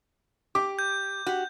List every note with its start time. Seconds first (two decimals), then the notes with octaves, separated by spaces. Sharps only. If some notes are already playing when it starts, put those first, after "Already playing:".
0.55 G4 D6
0.79 G6
1.26 F#4 G4